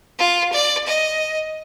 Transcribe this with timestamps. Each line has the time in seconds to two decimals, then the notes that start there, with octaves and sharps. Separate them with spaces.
0.18 F4
0.53 D5
0.87 D#5